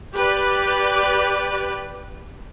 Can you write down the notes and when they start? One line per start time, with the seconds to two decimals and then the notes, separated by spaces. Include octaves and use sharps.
0.14 G4 B4 D5